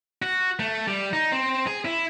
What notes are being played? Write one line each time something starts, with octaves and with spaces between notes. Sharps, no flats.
F#4
A3
G3
D#4
C4
G#4
E4